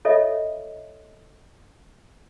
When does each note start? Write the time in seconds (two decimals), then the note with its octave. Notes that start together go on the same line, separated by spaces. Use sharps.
0.05 F4 A4 C#5 D#5 E5